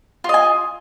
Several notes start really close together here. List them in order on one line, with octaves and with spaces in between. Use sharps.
F4 D#5 G#5